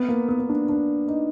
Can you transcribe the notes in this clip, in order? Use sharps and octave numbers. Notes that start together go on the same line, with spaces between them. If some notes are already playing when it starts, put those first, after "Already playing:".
Already playing: B3
A#3
B3
B3
D4
D4
D#4